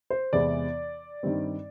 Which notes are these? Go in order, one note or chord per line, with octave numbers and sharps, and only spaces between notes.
C5
E2 C3 E3 G#3 B3 D5
G2 D#3 G3 C4